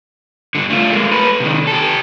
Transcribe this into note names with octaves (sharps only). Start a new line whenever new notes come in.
G2 D3
A3 F4
G#3 A#3
A4 B4
C3 D#3
G4 A4